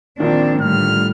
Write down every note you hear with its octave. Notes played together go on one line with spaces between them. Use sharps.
A#1 D#3 C4 D4
A2 D3 G3 F6